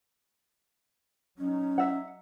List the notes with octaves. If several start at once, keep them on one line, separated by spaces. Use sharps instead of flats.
F#3 C#4 D#4
E5 F#5